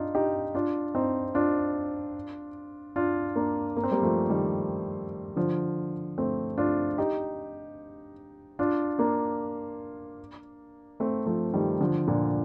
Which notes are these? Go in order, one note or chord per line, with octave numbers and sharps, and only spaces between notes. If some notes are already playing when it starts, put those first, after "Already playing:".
Already playing: D4 D#4 F4
D#4 G4
D4 F4
C4 D#4
D4 F4
D4 F4
A#3 D4
A#3
C4
G3 A#3
F3 A3
D#3 G3
D3 F3
A3 C4
D4 F4
D#4 G4
D4 F4
A#3 D4
A3 C4
F3 A3
D#3 G3
D3 F3
A#2 D3